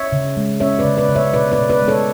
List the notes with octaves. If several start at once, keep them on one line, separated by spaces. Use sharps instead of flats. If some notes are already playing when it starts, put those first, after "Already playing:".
Already playing: C#5 E5
C#3
G#3
C#4 C#5 E5
B4 D5
C#3
B4 D5
C#3
C#5 E5
B2 B4 D5
B4 D5
B2
B4 D5
G#3
A4 C#5